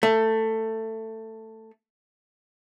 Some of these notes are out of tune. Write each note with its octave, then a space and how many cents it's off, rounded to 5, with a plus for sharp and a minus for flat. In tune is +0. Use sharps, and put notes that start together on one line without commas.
A3 +15